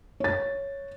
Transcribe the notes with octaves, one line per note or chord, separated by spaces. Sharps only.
C#5 A6